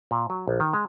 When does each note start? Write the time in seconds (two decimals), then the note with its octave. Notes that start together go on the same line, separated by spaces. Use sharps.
0.11 A#2
0.30 F#3
0.48 A#1
0.60 D#3
0.73 G#3